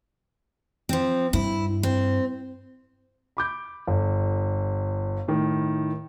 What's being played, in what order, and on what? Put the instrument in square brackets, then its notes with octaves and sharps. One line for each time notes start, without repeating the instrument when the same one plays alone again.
[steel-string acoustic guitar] F3 C4
[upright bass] G2 [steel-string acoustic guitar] E4
[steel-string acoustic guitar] C4
[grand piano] B5 D6 G6
G1
A2 D#3